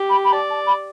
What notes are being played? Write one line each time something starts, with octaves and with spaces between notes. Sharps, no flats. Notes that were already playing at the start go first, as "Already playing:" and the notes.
Already playing: G4
B5
B5
D5 A5
A5
B5